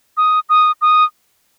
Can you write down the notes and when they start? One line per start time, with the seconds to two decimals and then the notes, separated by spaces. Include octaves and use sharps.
0.17 D#6
0.49 D#6
0.81 D#6